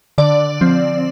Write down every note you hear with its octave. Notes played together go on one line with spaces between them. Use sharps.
D3 D5
F3 C4